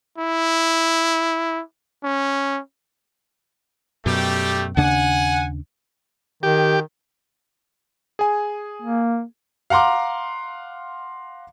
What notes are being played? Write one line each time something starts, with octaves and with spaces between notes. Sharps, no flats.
E4
C#4
F#2 B2 G3 A3 G4
D#2 C#3 D4 F#5 G#5
D#3 G4
G#4 G#5
A#3
F5 F#5 A#5 C6 D6